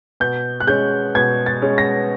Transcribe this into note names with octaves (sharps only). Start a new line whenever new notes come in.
B2 G6
F#6
G#3 C#4 G6
B2 G#6
A6
G#3 C#4
A#6